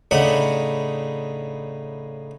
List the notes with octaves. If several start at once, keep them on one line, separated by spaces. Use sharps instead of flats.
A2 C#3 D4 D#4 F#5 B5